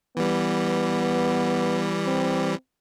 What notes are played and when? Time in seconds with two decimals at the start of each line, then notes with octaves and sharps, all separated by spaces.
0.17 E3 G3 B3
2.06 C4